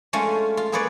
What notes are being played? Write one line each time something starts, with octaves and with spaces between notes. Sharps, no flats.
G#3 A3 C#4 F4
F4
A#3 G#4 B4 C#5 D5